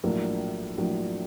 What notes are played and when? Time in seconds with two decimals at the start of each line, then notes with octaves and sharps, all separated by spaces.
0.04 A#1 A2 F#3 A#3 D4
0.77 A#1 A2 F#3 A#3 D4